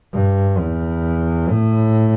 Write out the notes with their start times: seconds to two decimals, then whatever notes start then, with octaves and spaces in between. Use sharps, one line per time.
0.13 G2
0.59 E2
1.50 A2